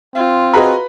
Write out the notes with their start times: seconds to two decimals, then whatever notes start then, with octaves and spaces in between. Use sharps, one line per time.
0.16 C4 F4
0.54 F#4 G#4 B4 D#5 A#5 B5